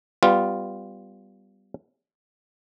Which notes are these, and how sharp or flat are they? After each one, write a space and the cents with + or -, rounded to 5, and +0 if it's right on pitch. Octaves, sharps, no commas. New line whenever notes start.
G3 +0 B3 +20 F4 +0